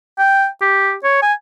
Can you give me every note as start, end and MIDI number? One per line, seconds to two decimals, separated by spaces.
0.18 0.47 79
0.62 0.94 67
1.04 1.19 73
1.22 1.33 80